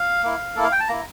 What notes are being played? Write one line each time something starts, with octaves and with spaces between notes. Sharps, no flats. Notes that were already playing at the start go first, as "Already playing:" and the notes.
Already playing: F5
A#3 E4
A#3 E4 A4
F5
G5
A5
A#3 E4 A#5